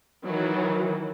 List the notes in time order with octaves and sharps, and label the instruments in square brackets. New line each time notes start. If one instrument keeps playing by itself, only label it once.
[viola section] D#3 E3 F#3